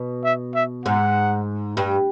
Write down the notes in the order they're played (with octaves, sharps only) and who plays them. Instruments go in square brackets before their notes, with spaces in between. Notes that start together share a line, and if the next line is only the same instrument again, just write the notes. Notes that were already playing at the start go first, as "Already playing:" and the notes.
Already playing: [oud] B2
[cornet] E5
E5
[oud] G#2 [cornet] F#5
[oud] G2